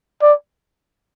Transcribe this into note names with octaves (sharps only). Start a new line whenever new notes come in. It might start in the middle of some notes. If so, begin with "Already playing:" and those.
D5